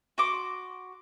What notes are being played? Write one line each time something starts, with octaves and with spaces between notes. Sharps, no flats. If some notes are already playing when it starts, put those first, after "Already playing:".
F#4 C6 D6